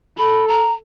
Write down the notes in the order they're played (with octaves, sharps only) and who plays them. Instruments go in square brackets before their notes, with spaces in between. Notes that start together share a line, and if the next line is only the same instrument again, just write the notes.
[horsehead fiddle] A4 [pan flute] B5
[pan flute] A#5